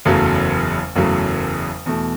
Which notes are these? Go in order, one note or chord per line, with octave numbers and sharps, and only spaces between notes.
F#1 E2 C#3 F#3 A3
F#1 E2 C#3 F#3 A3
E2 B2 A3